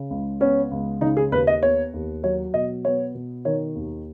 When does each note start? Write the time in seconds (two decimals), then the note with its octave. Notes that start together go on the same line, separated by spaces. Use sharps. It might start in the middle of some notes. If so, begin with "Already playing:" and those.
Already playing: C#3
0.10 C#2
0.40 B3 C#4
0.71 C#2
1.01 C#3 D#4
1.17 G#4
1.32 D#2 B4
1.47 D#5
1.62 B3 C#5
1.94 D#2
2.23 F#3 C#5
2.54 B2 D#5
2.85 B3 C#5
3.14 B2
3.45 D#3 C#5
3.76 D#2